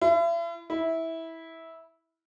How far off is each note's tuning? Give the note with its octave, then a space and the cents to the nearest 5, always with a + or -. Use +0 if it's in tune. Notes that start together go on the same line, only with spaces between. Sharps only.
E4 +40
E4 -15